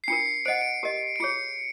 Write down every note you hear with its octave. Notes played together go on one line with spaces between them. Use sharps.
C7
D4 F4 A#4 C#7
C5 D#5 F#5 D7
D7
G4 A#4 D#5
D7
F4 G#4 C#5 C#7